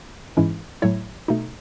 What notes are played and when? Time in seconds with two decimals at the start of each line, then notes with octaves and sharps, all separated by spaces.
0.37 G#2 E3 G#3 C#4 E4
0.82 A2 F#3 A3 E4 C#5
1.28 B2 A3 D#4